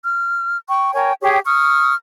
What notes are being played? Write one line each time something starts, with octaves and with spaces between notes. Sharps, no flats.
F6
G5 C#6
A#4 C#5 G5 G#5
G4 G#4 C#5 G5
C#6 D#6 F6